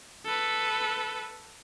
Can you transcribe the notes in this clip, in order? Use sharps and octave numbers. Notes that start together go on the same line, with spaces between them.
A4 B4